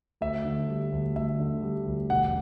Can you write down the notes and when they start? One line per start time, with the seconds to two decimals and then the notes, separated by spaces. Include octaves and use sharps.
0.21 D2 E5
0.45 D3
0.68 G3
0.92 D2
1.16 D2 E5
1.39 D3
1.63 G3
1.86 D2
2.10 E1 F#5